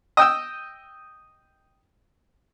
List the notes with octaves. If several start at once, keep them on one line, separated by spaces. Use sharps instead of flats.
D#5 G5 E6